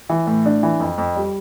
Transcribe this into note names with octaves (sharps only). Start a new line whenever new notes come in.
E3
A2
D4
E3
F2
F2
G3